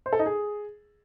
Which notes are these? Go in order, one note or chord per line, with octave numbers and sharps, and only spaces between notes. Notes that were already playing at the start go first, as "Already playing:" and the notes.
C5
A4
D#4
G#4